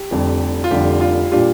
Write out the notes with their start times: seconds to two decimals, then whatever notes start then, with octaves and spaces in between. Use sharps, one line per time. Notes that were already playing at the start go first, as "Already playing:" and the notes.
Already playing: G4
0.11 F1 F2 D3 G3
0.64 F4
0.71 F1 F2 D3 G3 G4
1.01 F4
1.32 A#2 G3 D4 F4 G4